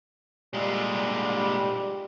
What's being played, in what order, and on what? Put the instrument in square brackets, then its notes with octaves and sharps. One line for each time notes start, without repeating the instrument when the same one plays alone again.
[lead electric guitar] A#2 G#3 [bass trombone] G3